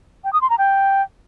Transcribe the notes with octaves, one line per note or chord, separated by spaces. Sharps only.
G5
D#6
C6
A#5
G5